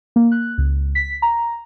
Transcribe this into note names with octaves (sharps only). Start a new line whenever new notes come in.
A#3
F#6
C#2
B6
A#5